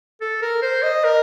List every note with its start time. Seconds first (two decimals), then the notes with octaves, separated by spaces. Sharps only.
0.21 A4
0.42 A#4
0.62 C5
0.83 D#5
1.04 A#4